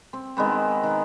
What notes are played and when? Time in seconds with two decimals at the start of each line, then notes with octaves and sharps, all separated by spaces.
0.13 C4
0.37 D#3 G#3 B3 C4
0.83 D#3